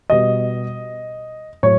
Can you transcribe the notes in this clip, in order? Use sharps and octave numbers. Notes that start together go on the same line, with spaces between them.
B2 G3 D#5
A2 F#3 C#5